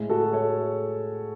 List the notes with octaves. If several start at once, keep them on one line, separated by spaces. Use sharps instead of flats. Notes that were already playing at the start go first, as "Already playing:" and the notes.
Already playing: A2 G#3
F#4 A4
A4 C#5